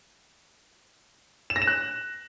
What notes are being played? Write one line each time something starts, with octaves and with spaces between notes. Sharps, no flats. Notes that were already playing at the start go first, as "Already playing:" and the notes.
E7
A#6
E7
F#6